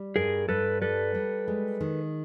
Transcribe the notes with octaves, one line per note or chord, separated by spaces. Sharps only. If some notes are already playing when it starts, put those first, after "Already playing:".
Already playing: G3
G2 G#4 A#4
G2 A4 B4
G3 A4 B4
G3
G#3
D#3